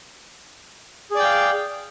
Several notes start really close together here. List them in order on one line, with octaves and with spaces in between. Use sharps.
G#4 D5 G5 F5